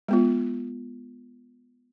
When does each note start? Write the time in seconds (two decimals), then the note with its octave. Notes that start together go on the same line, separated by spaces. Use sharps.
0.08 G#3 B3 F4